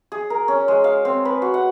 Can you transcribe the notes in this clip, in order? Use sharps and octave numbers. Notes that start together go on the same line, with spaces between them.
G#4
A#4
C#4
G#3
F5
C4
B4
F#4
F#5